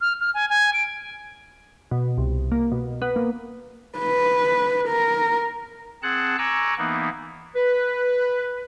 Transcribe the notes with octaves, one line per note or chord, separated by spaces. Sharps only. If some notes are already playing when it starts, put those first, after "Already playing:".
F6
F6
G#5
G#5
D7
B2
C2
A#3
B2
B3
A#3
B4
A#4
C4 G#4 F#5 A5 F#6
G#5 A#5 C#6 D6 E6 F#6
E3 A#3 B3 D#4
B4